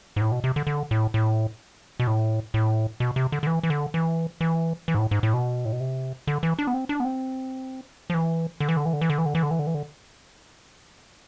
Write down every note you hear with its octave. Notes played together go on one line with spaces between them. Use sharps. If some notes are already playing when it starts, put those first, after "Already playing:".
G#2
A2
B2
C3
D3
D3
A2
A2
B2
A2
A2
B2
C3
D3
D3
E3
E3
D3
E3
E3
E3
G#2
A2
G#2
A2
B2
A2
B2
C3
D3
E3
D4
B3
C4
D4
B3
C4
F3
E3
D3
E3
D3
E3
D3
E3
D3
E3
D3
E3
D3
E3
D3
E3
D3